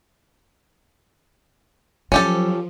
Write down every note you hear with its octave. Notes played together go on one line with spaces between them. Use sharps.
F3 F#3 C#4 G4 A4